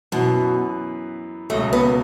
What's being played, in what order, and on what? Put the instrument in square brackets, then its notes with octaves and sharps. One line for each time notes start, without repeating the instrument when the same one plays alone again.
[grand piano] F#2 E3 B3 [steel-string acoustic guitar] B2
[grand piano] C#2 B2 F#3 [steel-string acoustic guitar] A3
[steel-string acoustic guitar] B3